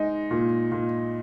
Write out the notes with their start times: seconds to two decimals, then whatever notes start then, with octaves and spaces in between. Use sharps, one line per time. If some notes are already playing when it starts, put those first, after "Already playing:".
Already playing: G#3 D#4
0.31 A#2
0.72 A#2